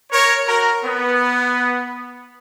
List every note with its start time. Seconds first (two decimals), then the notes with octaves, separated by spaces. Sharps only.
0.12 A#4 C#5
0.47 F#4 A#4
0.84 B3